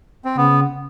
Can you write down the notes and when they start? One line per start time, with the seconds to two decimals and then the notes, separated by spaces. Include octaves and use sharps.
0.25 C4
0.36 C#3 B3